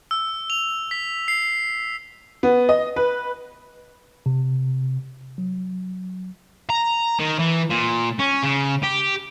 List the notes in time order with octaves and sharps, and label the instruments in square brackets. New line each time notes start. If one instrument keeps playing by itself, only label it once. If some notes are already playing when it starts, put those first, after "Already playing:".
[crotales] E6
F7
B6
C7
[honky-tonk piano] B3
D#5
B4
[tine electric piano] C3
F#3
[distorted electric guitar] A#5
D#3
E3
A#2
C#4
C#3
G4